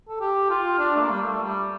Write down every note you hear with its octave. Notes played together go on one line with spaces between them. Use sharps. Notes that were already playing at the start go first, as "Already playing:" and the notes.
A4
G4
F4
D4
A3
A#3
G3
A3
G3